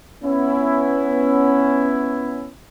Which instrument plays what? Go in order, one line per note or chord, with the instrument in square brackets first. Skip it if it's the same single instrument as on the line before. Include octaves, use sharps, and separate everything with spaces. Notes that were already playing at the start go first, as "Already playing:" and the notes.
[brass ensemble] B3 C#4 E4